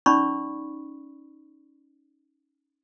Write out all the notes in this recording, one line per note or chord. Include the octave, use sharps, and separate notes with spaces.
C#4 D#4 D5 B5 C#6